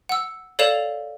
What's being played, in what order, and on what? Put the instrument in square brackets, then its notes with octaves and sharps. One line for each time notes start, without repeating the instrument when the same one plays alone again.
[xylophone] F#5 E6
A4 C#5 D5 F5 E7 F7